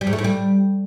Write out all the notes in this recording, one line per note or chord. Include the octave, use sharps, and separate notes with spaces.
G3
G#2
A3
A2
G3